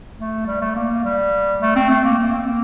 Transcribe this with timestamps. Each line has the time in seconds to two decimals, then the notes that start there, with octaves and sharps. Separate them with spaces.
0.19 A3
0.47 G3
0.61 A3
0.75 A#3
1.04 G3
1.61 A3
1.76 C4
1.90 A3
2.04 A#3
2.19 A#3
2.33 C4
2.47 A#3